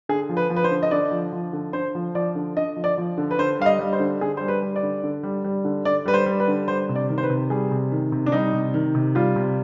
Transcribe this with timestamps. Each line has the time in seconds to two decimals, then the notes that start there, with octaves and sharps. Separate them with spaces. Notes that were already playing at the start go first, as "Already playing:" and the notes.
0.09 D3 G#4
0.29 F3
0.37 B4
0.50 F3
0.56 B4
0.64 C5
0.71 D3
0.83 D#5
0.91 D3 D5
1.11 F3
1.32 F3
1.53 D3
1.73 D3 C5
1.95 F3
2.15 F3 D5
2.35 D3
2.56 D3 D#5
2.76 F3
2.84 D5
2.98 F3
3.18 D3
3.31 B4
3.38 D3 C5
3.59 G3 F5
3.66 D#5
3.79 G3
3.93 C5
4.00 D3
4.21 D3 G#4
4.37 G3 C5
4.48 B4
4.62 G3
4.76 D5
4.83 D3
5.03 D3
5.23 G3
5.44 G3
5.64 D3
5.85 D3 D5
6.06 G3 B4
6.14 C5
6.26 G3
6.40 B4
6.48 D3
6.68 G3 C5
6.89 C3
6.96 D5
7.09 D#3
7.18 C5
7.23 B4
7.30 C3
7.50 G3 G#4
7.71 C3
7.92 D#3
8.12 C3
8.26 D4
8.32 G3 D#4
8.53 C3
8.74 D#3
8.95 C3
9.15 G3 F4
9.36 C3